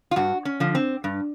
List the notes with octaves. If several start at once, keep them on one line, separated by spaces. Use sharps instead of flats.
F4
G2 F#4
C#4
D3 F3
C4
G2